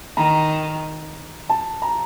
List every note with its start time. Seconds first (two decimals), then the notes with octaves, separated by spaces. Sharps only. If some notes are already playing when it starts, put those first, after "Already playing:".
0.17 D#3 A#5
1.50 A5
1.82 A#5